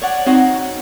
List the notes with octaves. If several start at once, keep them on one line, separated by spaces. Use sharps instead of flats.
C#5 D5 F#5
C4 D#4 F#4 C5 C#5 F#5